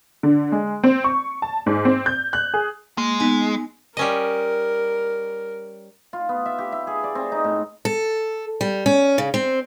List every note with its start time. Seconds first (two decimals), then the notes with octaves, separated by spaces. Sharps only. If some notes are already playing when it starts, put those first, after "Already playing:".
0.23 D3
0.52 G#3
0.84 C4
1.04 C#6
1.42 A5
1.66 G#2
1.85 C4
2.06 G6
2.33 F#6
2.54 G#4
2.98 G#3 A#3
3.20 B3 D#4 G#5
3.97 G3 C#4 A#4 D#5
6.13 F4
6.29 B3
6.46 E5
6.59 G4
6.72 E5
6.87 G#4
7.04 D5
7.15 C4
7.32 D#4
7.44 A2
7.85 A4
8.61 G3
8.86 C#4
9.18 C#3
9.34 C4